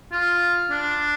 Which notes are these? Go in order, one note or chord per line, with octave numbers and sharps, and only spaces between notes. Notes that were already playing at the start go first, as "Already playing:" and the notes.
F4
D4